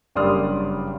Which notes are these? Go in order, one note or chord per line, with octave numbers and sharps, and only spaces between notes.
F#1 G2 D5 C6 D#6 F6